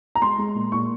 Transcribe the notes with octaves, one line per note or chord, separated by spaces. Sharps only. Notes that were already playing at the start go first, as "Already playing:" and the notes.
A#5
G#3 C6
G#3
A#2
A#2 C#6